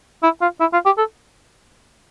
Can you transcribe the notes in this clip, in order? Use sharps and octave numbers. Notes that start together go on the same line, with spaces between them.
E4
F4
E4
F4
G4
A4